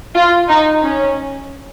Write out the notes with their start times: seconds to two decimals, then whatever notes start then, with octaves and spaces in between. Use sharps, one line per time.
0.16 F4
0.49 D#4
0.82 C#4